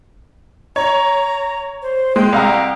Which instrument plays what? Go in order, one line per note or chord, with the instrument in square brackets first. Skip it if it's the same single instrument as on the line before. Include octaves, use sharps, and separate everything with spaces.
[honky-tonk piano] C#5 [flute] A#5
[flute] C5
[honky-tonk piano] G#3 [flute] G5
[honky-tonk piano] C2 F5 A#5